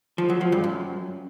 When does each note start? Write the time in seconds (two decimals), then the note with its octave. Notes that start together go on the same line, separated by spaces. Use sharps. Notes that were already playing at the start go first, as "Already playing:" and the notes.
0.18 F3
0.30 F#3
0.41 F3
0.52 G2
0.64 F#2